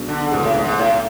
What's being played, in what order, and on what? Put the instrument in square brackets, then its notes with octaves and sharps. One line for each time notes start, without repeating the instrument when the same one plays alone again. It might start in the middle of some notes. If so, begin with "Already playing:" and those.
Already playing: [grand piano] B1 B2 G#3 D4
[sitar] D3
[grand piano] C#2 B2 A3 E4 G#4 [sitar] G#2
[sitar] A2
G#2
G#2
A2